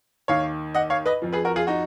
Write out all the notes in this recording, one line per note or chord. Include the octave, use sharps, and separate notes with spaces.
D#2 D#3 C#5 F5
D#5 F#5
C#5 F5
B4 D#5
F2 F3
G#4 B4
F#4 A#4
F4 G#4
D#4 F#4